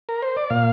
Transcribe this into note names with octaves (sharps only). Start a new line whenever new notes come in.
A#4
C5
D5
A#2 F5